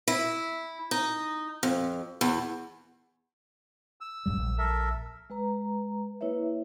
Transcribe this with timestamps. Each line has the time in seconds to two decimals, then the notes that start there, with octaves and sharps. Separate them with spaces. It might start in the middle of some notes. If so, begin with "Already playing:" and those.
0.08 E4
0.91 D#4
1.63 F2
2.21 E2
4.01 E6
4.26 D1 F#2 G3
4.37 A#1
4.58 A4 A#4 E5
5.30 G#3 B4 A#5
6.21 A#3 E4 B4 C#5 E5